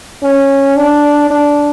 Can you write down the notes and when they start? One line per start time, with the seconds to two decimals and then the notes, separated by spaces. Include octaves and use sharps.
0.23 C#4
0.76 D4
1.30 D4